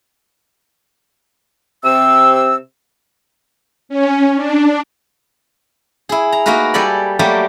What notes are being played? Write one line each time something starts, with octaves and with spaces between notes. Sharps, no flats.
C3 C4 E6
C#4
D4
E4 G#4
A#5
A#3 D#4 F#4 A#4 B4
G3 A4 D5 G#5 B5
F#3 G3 A3 A#3 G4